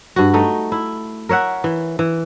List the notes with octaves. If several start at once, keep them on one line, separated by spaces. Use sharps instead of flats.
G2 F#4
A3 D#4
E4
A#4 C#5 E5 F#5
E3
E3